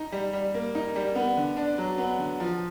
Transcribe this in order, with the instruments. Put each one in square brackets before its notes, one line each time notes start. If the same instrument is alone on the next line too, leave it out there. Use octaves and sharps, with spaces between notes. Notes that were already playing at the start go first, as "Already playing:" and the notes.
Already playing: [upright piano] D#4
G3
G3
A#3
D#4
G3
B3
D3
D4
F#3
B3
D3
F3